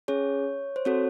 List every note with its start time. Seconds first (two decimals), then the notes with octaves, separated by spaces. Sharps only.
0.08 C#4 G#4 C#5
0.76 C5
0.85 C4 F#4 A4 C#5